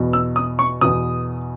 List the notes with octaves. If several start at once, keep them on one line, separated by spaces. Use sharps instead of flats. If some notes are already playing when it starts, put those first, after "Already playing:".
Already playing: E2 B2
E6
D#6
C#6
E2 B2 D#6